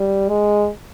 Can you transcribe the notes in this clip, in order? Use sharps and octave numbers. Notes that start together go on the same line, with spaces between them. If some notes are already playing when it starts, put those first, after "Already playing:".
Already playing: G3
G#3